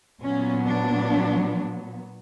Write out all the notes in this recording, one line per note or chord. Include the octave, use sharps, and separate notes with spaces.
A#2 F#3 B3 C#4
D4